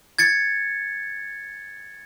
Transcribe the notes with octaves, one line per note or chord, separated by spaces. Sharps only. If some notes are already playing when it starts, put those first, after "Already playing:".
G#6 A6 C#7